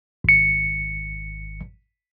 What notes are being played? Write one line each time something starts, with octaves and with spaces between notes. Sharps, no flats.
G#1 C#7